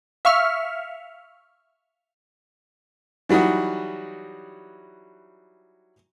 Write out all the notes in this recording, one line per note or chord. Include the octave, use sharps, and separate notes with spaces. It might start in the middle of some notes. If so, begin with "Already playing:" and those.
E5 F5 C#6 F6
E3 F#3 G3 D#4 F#4